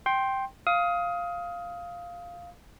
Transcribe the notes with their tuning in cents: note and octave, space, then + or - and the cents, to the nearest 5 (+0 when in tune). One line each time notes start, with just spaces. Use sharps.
G5 -5 C6 +15
F5 +0 D#6 +25